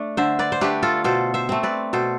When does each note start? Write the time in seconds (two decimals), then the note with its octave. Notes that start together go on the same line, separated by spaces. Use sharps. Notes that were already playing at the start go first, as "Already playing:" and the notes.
Already playing: A3 D4
0.17 D3 C5 E5
0.39 B4 D5
0.52 C5
0.61 A3 D4 G4 B4
0.82 F4 A4
1.04 B2 A4 C5
1.34 C5 E5
1.49 A3 C4
1.63 B4 D5
1.93 B2 A4 C5